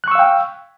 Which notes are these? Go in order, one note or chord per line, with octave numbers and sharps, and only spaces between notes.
F5 G5 C#6 E6 F#6